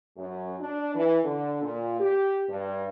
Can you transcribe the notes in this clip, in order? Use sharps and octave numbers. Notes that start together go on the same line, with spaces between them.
F#2
D4
E3
D3
A#2
G4
G2